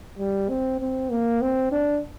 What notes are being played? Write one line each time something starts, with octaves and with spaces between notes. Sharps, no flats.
G3
C4
C4
A#3
C4
D4